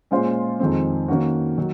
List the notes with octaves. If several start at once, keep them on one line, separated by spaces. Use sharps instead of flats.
A#2 G#3 C#4 F4 C5
F2 D#3 G#3 C4
D#3 A#3 C#4 F#4
D#3 F#3